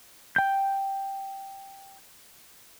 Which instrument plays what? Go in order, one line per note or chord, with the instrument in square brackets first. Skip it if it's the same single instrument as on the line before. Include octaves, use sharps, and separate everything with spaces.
[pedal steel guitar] G5 G6